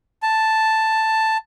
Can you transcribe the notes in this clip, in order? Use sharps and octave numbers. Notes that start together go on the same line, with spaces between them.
A5